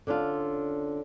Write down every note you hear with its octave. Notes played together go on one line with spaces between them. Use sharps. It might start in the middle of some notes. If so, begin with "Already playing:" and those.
D3 C#4 D4 F4